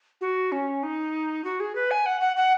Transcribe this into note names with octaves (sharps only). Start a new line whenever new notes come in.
F#4
C#4
D#4
F#4
G#4
B4
G#5
F#5
F#5
F#5